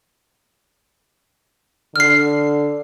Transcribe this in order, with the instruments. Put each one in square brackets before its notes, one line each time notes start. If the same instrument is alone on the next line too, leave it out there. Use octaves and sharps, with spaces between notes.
[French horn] D3 [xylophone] F6 C7